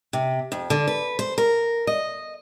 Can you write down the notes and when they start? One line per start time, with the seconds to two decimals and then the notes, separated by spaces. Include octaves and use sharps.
0.13 C3
0.52 F2
0.70 D3
0.87 B4
1.19 C5
1.38 A#4
1.87 D#5